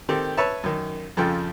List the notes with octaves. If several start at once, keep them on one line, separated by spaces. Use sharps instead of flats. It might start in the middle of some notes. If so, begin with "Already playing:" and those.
D#3 C4 G4 A4
B4 C#5 E5 A5
F#2 D#3
F2 C#3 F3 A4 G5